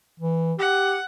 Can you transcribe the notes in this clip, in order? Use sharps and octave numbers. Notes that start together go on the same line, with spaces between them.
E3
G4 F#5